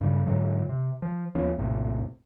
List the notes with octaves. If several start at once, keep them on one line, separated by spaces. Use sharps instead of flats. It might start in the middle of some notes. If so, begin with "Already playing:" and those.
G2 C#3 G3
G#2 D3 F#3
C3
F3
D#2 F3 B3 C#4
A#1 F2 A2 C3